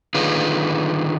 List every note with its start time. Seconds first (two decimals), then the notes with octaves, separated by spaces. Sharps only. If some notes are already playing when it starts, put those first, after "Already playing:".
0.15 D3 D#3 D#4 F4 G#4 B4